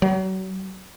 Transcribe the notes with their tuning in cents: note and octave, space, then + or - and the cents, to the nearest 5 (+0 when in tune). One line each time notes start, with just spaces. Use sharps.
F#3 +35